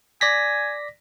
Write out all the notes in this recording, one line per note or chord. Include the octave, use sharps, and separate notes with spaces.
D5 G#5 A#6 B6